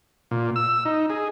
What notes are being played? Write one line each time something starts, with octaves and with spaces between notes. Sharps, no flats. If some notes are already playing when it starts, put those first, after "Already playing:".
A#2
E6
D#4
G#4